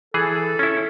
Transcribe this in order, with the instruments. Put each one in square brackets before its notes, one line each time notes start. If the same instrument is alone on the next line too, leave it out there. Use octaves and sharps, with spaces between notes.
[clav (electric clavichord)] E3 G#4 [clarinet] A4
[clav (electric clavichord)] C#4 E4